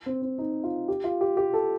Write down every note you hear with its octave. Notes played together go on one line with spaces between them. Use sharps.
C4
C4
D#4
F4
G4
F4
G4
G4
A4